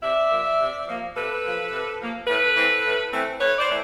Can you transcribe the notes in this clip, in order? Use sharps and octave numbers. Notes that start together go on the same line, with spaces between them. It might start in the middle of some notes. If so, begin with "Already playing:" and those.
C3 D5 E5
F3 A#3
C3
F3 A#3
C3 A4 B4
F3 A#3
C3
F3 A#3
A2 A4 B4
E3 A3 C4
A2
E3 A3 C4
A2 B4 C#5
C5 D5
E3 A3